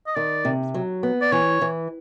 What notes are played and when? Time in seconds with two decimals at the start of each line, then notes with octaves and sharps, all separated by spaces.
0.07 D#5
0.16 D#3 D5
0.45 C3
0.74 F#3
1.03 B3
1.21 D5
1.32 E3 C#5
1.62 E3